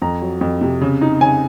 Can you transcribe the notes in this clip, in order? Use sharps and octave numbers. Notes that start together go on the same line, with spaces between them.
F2 A#5
F#3
F2
C3
C#3
D#4
C#3 G#5